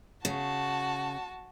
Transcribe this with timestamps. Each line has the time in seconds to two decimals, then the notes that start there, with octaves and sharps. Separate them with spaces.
0.25 C#3 F#4 A5